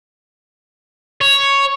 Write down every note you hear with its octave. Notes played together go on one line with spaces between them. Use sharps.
C#5